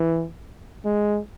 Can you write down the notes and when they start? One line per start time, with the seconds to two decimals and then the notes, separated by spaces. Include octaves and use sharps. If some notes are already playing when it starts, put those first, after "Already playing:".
Already playing: E3
0.85 G#3